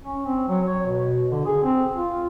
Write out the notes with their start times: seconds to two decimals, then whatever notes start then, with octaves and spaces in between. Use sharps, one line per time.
0.03 C#4
0.26 C4
0.48 F#3
0.67 C#5
0.86 B2
1.32 D3
1.46 G#4
1.63 C4
1.96 F4